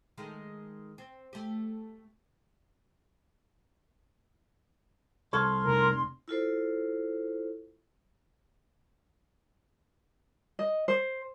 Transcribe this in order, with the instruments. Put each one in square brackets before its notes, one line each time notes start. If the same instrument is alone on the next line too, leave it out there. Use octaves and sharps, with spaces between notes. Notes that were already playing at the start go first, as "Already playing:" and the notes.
[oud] D#3 G#3 A3
C4
A3 G4
[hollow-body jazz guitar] C2 A4 [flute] C6 [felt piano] C#6 F6 G#6
[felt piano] F1 [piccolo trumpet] A#4
[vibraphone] E4 F4 A4 C5
[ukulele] D#5
C5